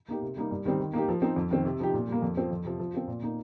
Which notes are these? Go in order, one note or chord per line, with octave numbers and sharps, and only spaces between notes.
A#3 D#4 G4
C3
G3 A#3 D#4
G2
D#3 G3 C4 D#4
D#3
A#3 D#4 G4
F3
C4 D#4
F2
D#3 C4
C3
F3 D#4 G4
A#2
G3 A#3
F2
F3 C4
F2
C3 F3
F3
C4 F4
A#2
A#3 D#4